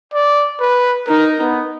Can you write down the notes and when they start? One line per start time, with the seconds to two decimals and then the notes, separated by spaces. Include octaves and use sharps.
0.14 D5
0.60 B4
1.08 D#4 A#4
1.40 B3